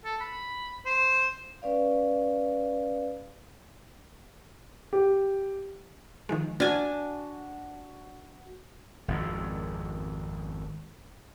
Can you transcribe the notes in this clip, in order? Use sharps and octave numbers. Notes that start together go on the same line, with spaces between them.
A4
B5
C5
C#4 B4 D5 F5
G4
D#3 F3 G#3
D4 F#4 G#5 F6
G#1 F2